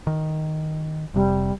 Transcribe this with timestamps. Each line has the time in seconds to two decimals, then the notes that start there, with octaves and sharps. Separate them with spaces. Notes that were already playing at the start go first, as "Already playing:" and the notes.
0.07 D#3
1.14 F1 C3 G3